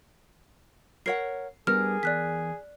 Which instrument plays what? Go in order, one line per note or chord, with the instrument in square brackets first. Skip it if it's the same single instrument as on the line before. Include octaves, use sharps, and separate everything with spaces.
[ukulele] A#4 C#5 F#5 [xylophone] C7
[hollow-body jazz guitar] G3 B3 D4 [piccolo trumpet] G#4 [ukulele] A#4 [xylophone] F6
[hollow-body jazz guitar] E2 [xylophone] D5 F#6 B6